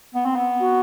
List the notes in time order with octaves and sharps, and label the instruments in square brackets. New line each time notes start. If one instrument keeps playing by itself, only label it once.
[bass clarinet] B3
C4
B3
[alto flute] F#4